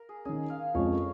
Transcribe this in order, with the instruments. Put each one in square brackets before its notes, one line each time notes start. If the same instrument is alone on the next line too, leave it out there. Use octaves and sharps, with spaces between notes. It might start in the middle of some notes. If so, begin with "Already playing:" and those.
Already playing: [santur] A#4
G#4
[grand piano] D#3 C#4 [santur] G#4
[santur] F5
[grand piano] F2 F3 G#3 C#4 [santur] C#5